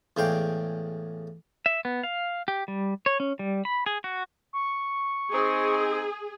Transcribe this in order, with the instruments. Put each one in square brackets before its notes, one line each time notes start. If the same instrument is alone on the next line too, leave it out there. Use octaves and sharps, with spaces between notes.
[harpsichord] E2 A2 G#3 F5 G5 D6
[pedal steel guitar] E5
B3
F5
G4
G3
C#5
C#4
G3
B5
G#4
F#4
[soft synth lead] C#6
[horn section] C4 D#4 [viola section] G#4